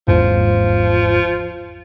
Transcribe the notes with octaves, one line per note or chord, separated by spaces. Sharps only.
G#1 E2 G#2 F3